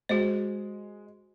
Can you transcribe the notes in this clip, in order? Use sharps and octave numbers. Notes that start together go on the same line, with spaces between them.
G#3 F#4 C5